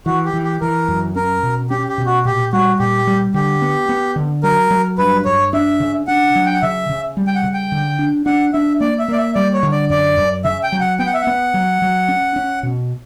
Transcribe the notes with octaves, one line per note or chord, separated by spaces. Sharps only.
E3 F#4
G4
E3
G4
E3 A#4
F#2
C#4 A#4
B2
C#4 G4
G4
B2
F#4
A#2 G4
G3 F#4
A#2 G4
G3
D3 G4
B3
B3
D3
F#3 A#4
F#3
G2 B4
G2 C#5
D4 E5
C#3
D4 F#5
F#3
G5
F#5
C#3 E5
C#3
G3
G5
F#5
C#3
G5
D3
D4
D4 F#5
D4 E5
A#3 D5
E5
A#3 D5
E5
G3 D5
C#5
D3
D5
F#2 D5
F#2
C#3 E5
G5
F#3
F#5
B3 G5
F#5
E5
F#5
B3
F#3
F#3
C#4
C#4
B2